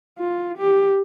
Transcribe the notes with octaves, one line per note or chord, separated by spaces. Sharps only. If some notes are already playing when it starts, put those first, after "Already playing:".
F4
G4